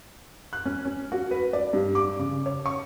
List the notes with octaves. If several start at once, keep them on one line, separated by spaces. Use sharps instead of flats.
F#6
C#4
C#4
F#4
B4
D5
G2
D6
C#3
C#5
C#6